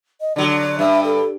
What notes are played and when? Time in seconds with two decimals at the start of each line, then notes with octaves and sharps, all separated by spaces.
0.21 D#5
0.36 D3 F#3 D5
0.79 G2 E5
1.04 A4